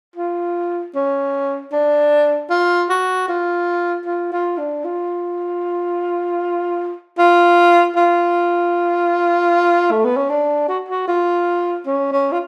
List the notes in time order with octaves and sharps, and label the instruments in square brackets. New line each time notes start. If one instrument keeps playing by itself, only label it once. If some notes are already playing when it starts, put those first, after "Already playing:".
[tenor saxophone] F4
C#4
D4
F4
F#4
F4
F4
F4
D4
F4
F4
F4
A3
B3
C#4
D4
F#4
F#4
F4
C#4
C#4
F4